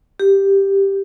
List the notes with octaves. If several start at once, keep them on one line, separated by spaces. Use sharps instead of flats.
G4